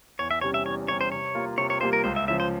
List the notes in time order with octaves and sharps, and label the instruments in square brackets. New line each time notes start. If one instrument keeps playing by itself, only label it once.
[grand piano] E2 [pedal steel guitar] C#5
[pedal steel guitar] E5
[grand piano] C3 G3 C#4 [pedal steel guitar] C#5
[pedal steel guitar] E5
[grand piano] E2 [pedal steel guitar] C#5
[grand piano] C3 G3 C#4 [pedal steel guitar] C#5
[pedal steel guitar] C5
[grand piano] C3 [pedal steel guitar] C#5
[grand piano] G3 A#3 F4
[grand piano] C3 [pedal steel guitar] C#5
[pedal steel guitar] C#5
[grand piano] G3 A#3 F4 [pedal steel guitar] C5
[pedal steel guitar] A#4
[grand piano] C#2 [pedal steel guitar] C5
[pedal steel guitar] E5
[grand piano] C#3 F3 [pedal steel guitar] E5
[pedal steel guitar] C5